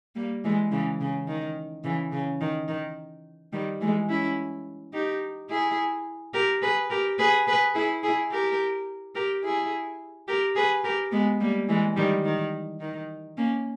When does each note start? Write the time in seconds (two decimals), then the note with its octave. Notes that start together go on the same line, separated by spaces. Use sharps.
0.15 G3 A#3
0.44 E3 G#3
0.71 C#3 E3
1.01 C#3
1.28 D#3
1.84 C#3 E3
2.12 C#3
2.41 D#3
2.68 D#3
3.53 D#3 G3
3.81 E3 G#3
4.09 C#4 E4
4.93 D#4 G4
5.49 E4 G#4
6.34 G4 A#4
6.62 G#4 B4
6.90 G4 A#4
7.18 G#4 B4
7.47 G#4 B4
7.74 E4 G#4
8.03 E4 G#4
8.32 G4 A#4
9.15 G4 A#4
9.44 E4 G#4
10.28 G4 A#4
10.55 G#4 B4
10.84 G4 A#4
11.12 G#3 B3
11.40 G3 A#3
11.69 E3 G#3
11.96 D#3 G3
12.25 D#3
12.80 D#3
13.37 A#3 C#4